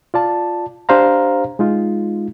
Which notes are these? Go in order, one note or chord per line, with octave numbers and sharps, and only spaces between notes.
F4 D5 A5
D4 G4 C5 F5 A#5
G#3 D#4 F4